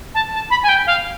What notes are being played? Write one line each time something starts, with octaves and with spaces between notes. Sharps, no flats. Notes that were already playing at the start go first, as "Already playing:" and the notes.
A5
A5
B5
G#5
G5
F5